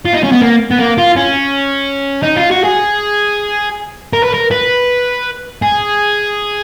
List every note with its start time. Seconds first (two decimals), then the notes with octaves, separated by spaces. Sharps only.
0.05 F4
0.14 D#4
0.24 C#4
0.32 B3
0.41 A#3
0.71 B3
0.79 A#3
0.98 F4
1.16 C#4
2.23 D#4
2.36 F4
2.51 F#4
2.64 G#4
4.13 A#4
4.24 B4
4.34 A#4
4.51 B4
5.62 G#4